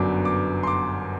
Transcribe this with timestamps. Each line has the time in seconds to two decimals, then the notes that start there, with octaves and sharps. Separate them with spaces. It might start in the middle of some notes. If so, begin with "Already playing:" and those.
Already playing: G1 F#2 F#3 B3 D4 D6
0.25 D6
0.63 C6
0.67 D6